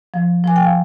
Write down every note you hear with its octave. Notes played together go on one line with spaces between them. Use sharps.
F3
F3 G#5
G5
F5